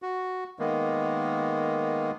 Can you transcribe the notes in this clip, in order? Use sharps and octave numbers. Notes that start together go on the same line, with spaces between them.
F#4
D#3 G#3 A#3 B3